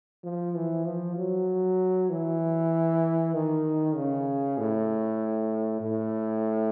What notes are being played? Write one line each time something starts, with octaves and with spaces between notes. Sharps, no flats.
F3
E3
F3
F#3
E3
D#3
C#3
A2
A2